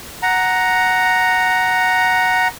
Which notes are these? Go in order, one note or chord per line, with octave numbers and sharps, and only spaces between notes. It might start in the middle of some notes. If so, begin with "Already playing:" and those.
F#5 A#5